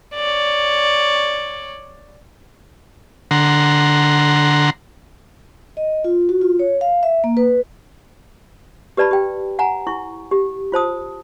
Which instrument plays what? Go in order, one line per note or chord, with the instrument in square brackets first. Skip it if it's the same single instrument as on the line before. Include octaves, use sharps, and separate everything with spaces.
[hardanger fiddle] C#5 D5
[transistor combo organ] D3 F#5 A#5 C6
[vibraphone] D#5
F4
F#4
F4
C#5
F5
E5
A#3
B4
[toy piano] G4 B4 D5 A5 B5
G4 G5
F#5 G#5 A#5
E4 C#6
G4
F4 C5 A5 D#6